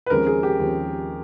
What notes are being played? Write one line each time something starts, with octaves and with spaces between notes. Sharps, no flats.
B4
D#2 C#3 F3 G#3 C4 A#4
G#4
G4
D#2 C#3 F3 G#3 C4